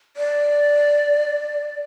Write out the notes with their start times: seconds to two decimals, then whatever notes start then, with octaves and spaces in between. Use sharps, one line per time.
0.17 D5